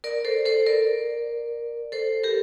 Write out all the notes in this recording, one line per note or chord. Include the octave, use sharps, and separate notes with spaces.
A#4 D5
A4 C5
A4 C5
A#4 D5
A4 C5
G4 A#4